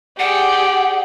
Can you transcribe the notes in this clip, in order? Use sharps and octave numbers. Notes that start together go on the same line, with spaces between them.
G4 G#4 D5 F#5